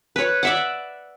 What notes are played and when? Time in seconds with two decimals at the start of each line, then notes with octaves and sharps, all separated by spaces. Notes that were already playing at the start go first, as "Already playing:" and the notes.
0.16 B4 C#5
0.43 D5 E5 F#5